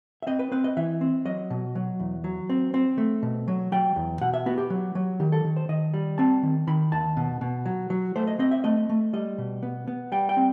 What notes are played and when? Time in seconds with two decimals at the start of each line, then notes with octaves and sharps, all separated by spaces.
0.22 E5
0.27 C4 D#5
0.39 B4
0.52 C4 B4
0.64 D#5
0.77 E3 E5
1.01 C4
1.25 F#3 D#5
1.50 B2
1.75 F#3
2.00 E2
2.24 F#3
2.50 C4
2.74 C4
2.98 A3
3.23 B2
3.48 F#3
3.72 F#3 G5
3.96 E2
4.21 B2 F#5
4.34 E5
4.46 B3 F#4
4.58 G4
4.70 F#3
4.95 F#3
5.20 D#3 G4
5.32 A4
5.45 D#3
5.57 C5
5.69 D#3 D#5
5.94 G3
6.18 C4 A5
6.43 D#3
6.67 D#3 B5
6.92 D#2 A5
7.17 B2
7.41 B2
7.66 F#3
7.90 F#3
8.16 A3 C5
8.27 D#5
8.39 C4 D#5
8.51 E5
8.64 A3 D#5
8.89 A3
9.13 G3 D#5
9.38 B2
9.63 B3
9.88 B3
10.12 G3 G5
10.29 G5
10.37 C4